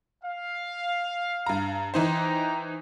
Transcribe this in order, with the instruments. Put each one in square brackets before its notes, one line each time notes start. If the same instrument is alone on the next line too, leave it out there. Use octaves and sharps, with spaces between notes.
[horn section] F5
[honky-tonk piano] G2 A#5
[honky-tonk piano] E3 D#4 C5 [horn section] G5 A#5